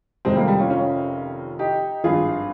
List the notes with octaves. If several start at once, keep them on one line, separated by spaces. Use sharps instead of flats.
F1 F2 C3 D#3 G#3 C4
G3 A#3
G3
C#4 F4
C#4 F4
D#4 G4
G#1 G2 F3 F4 G#4